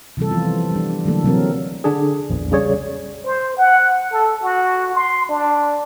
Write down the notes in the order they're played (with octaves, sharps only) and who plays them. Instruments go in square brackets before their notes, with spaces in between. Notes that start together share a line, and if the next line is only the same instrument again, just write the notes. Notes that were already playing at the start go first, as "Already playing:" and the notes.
[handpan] C3 E3 G3 A4
E3 F3 B3 F4
G3 D4
D3 E3 F#3 A3 A#3 A4
C3 F#3 C4 A#4
[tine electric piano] D3 D4 G#4
A#1 E2
C#3 G3 G#4 C#5 D5
[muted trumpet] C5
F#5
A4
F#4
C6
D4